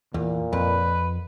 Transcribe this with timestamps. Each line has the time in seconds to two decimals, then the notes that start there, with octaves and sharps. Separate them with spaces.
0.14 E2 A#2
0.53 F2 B4